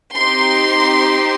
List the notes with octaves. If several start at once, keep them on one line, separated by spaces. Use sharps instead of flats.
C4 D#4 G4 C6